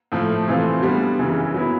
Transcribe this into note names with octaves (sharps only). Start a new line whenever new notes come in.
A2 F3 A3
C3 E3 A3 C4 F4
G3 B3 D4
F#2 C#3 E3
F#3 B3 E4